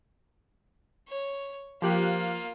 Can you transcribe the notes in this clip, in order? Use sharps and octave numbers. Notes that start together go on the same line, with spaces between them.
C#5
F3 A#3 F4 G4 F#6